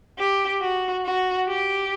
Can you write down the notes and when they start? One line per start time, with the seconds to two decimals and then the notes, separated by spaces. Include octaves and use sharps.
0.18 G4
0.61 F#4
1.05 F#4
1.48 G4